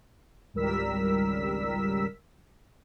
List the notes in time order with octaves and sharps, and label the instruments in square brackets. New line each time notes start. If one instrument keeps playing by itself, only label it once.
[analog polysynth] G#1 C#2 G3 A#4 E6 B6